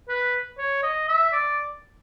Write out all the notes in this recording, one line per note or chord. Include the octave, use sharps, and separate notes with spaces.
B4
C#5
D#5
E5
D5